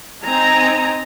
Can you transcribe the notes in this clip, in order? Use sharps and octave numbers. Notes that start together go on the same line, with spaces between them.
C4 D#4 G#5 A#5